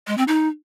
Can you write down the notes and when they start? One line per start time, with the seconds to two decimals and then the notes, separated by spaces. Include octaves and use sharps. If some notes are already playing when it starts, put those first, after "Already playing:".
0.07 G#3
0.17 C4
0.28 D#4